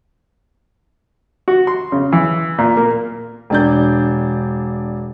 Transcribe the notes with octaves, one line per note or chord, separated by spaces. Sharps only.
F#4
C6
C#3
E3
A#2
A#3
E1 D4 G6